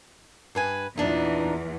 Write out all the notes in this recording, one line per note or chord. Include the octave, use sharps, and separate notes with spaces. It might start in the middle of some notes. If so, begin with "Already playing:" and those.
G2 B4 G#5
E2 A#2 E3 D4 D#4